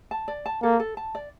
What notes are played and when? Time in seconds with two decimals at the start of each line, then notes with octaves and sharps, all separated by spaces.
0.11 A5
0.28 D5
0.46 A5
0.63 A#3 A4
0.80 A4
0.97 A5
1.15 D5